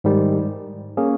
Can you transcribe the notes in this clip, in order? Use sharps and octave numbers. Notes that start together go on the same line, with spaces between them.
G#2 D#3 G3
A#3 C#4 G#4